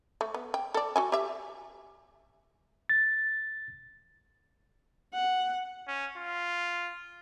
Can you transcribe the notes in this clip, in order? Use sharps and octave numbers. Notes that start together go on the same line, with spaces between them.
A3
B3
G5
A4 D5
F#4 A4 G#5
G4 E5
A6
F#5
C#4
F4